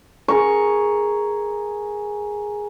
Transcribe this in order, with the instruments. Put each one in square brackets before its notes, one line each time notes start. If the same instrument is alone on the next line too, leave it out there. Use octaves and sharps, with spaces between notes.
[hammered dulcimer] G#4 A#4 C#6